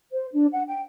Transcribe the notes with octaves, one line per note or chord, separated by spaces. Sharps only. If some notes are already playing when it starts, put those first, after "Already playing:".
C5
D4
F#5
G5